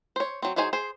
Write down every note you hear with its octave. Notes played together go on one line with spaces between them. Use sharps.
C5 C#5
F#3 C4
F#3 D#4 G#4 C5 G#5
G#4 C5